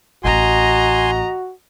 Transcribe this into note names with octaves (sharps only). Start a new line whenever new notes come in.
A1 A3 F#4 D#5 G#5 A#5 C6